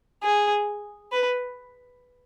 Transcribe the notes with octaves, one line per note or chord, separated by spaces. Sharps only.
G#4
B4